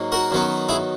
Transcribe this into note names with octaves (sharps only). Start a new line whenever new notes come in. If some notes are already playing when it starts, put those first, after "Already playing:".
Already playing: G#2 F#3 A#3
F#4 A#4
F#2 D#3 F#3 B3
E4 G#4